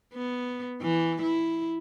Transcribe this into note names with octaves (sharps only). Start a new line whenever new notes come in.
B3
E3
E4